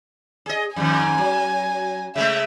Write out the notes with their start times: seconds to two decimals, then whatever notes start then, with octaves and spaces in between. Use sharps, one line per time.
0.46 G#4 D#5
0.76 F2 G#2 D#3 G#5
1.18 F#3
2.16 C#3 G#3 A3 E5